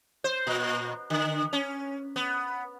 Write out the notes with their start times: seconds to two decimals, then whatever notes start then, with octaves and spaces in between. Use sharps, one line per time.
0.24 C5
0.47 A#2
1.10 D3
1.53 C#4
2.16 B3